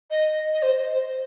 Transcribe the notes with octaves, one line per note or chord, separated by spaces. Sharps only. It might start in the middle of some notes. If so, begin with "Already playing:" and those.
D#5
D#5
C5
C5